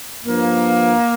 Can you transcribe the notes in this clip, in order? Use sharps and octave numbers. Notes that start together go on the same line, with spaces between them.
G2 F3 A#3